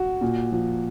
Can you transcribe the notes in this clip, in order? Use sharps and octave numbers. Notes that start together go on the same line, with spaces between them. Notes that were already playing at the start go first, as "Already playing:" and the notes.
Already playing: F#4
A#2
F3